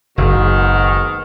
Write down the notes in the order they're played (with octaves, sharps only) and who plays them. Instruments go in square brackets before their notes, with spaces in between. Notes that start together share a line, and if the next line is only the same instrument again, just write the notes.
[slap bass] F#1 [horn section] G#2 B2 D#3